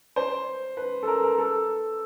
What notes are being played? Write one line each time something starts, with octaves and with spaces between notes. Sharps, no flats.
C5
B4
A4
A#4
A#4
A4